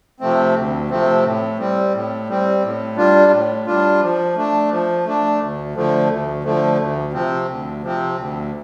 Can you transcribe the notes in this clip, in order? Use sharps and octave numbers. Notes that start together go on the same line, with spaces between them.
C3 F3 A3 C4
D2
C3 F3 A3 C4
A2
G3 C4
A2
G3 C4
A2
G3 D4 F4
A2
G3 D4 F4
F3
A3 D4
F3
A3 D4
D2
D3 F3 A3
D2
D3 F3 A3
D2
C3 F3 C4
D2
C3 F3 C4
D2